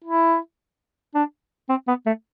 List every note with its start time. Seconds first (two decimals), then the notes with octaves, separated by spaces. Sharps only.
0.04 E4
1.15 D4
1.69 C4
1.88 B3
2.06 A3